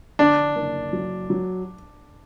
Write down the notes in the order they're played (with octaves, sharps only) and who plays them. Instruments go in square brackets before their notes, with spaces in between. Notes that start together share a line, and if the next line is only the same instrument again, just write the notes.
[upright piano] D3 [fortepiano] D4
[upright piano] F#1
F#3
F#3